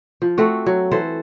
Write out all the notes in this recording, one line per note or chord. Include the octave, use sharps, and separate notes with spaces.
F3
A3 C4 F#4
F#3
E3 A4 C5